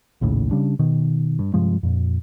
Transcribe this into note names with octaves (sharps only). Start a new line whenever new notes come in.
A#1 D#2 A2 C#3
C#3 G3 D4
B2 D#3
G2
G2 C3 F3 G#3
F2 A#2